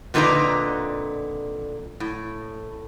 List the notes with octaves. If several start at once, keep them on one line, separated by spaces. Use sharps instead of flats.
F2 A#2 D3 D#4 B4 A#5
A2